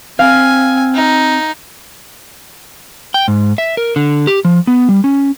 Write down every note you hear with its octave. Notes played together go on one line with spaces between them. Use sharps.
C4 F5 G#5
D#4
G5
G#2
E5
A#4
D3
G4
F3
B3
G3
C#4